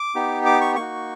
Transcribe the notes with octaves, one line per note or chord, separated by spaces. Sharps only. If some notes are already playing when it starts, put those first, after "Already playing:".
Already playing: D6
B3 D#4 G4
D6
C#6
A#3 D#4 F#4 C#6